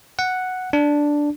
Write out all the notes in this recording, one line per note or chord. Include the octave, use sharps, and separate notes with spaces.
F#5
D4